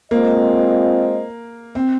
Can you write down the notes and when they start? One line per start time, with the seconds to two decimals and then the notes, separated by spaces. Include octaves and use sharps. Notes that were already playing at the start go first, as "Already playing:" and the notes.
0.11 G#3 A#3 C4 F4 C5 D#5
1.75 C4